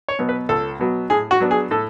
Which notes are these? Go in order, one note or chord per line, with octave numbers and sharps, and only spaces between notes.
C#5
B2 F#3 B3
B4
C#2 A4
B2 F#3 B3
A2 G#4
F#4
F#3 B3 D4
G#4
A2 A4